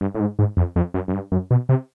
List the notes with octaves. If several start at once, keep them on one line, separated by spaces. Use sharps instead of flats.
G2
A2
G#2
G#2
F2
F2
F#2
F#2
G2
F#2
B2
C3